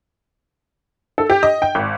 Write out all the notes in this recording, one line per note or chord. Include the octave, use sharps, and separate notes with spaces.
A4
G4
D#5
G5
G#1